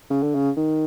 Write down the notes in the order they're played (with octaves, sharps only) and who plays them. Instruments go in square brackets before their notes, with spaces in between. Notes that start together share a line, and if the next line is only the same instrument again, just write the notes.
[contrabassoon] C#3
D3
C#3
D#3